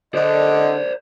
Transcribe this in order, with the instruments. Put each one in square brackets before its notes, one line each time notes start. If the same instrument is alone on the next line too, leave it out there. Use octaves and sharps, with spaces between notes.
[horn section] D3 [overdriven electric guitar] C5 D5 [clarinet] D#5